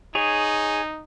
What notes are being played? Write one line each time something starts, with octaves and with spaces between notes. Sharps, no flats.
D#4 G#4 C#5